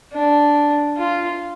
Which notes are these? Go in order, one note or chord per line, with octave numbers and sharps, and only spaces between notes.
D4
F4